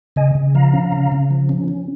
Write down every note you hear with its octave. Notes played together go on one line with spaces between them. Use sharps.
C#3 D#5 G#5
C#3
F3 F5 A#5
C#4
C#3
C#3
F3
C#4
C#4